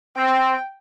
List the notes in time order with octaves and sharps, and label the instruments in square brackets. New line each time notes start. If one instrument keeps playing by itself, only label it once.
[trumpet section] C4 [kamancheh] G5